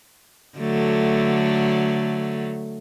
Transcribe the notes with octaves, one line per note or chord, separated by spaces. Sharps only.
D3 F#3 A3